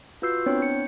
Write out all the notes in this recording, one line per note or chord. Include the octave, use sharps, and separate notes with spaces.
F4 F#4 B4 E6 G6 C7
B3 C4 D4 E4 C#5
G6 C#7